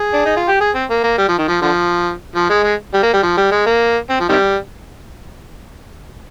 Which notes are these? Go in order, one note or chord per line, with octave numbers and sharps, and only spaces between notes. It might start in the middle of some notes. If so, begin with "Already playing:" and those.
Already playing: G#4
D4
D#4
F4
G4
G#4
C4
A#3
A#3
G3
F3
D#3
F3
D3 F3
F3
G#3
G#3
G3
A#3
G3
F3
G3
G#3
A#3
C4
F3
C3 D#3 G3